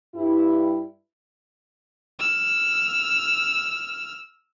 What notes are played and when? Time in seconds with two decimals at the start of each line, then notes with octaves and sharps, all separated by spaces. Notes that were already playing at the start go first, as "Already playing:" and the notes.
0.14 G2 E4
2.19 E6 F6